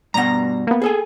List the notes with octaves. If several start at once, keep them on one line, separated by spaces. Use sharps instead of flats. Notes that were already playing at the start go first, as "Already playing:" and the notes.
G2 B2 F#5 A#5 A#6
A#3 B3
G#4 A4 G#5